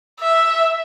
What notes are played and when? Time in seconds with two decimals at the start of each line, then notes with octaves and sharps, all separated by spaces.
0.20 E5